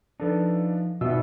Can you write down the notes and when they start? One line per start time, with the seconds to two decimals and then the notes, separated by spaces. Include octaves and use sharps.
0.20 F3 D4 D#4 A4 B4
1.01 G#1 B2 D#4 F4 E5 E6